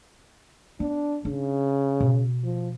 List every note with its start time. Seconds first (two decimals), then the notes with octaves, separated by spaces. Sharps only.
0.80 B3 D4
1.25 C#3 D4
2.00 B2
2.44 F3